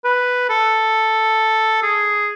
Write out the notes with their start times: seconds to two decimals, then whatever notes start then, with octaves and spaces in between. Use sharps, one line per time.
0.04 B4
0.49 A4
1.83 G#4